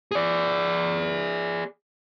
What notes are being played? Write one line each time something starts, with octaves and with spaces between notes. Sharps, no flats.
G#4 D5